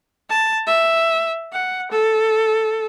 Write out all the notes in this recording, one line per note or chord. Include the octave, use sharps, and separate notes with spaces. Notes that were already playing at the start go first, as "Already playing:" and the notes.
A5
E5
F#5
A4